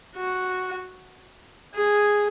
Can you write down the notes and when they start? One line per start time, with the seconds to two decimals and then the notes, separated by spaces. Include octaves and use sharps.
0.16 F#4
1.75 G#4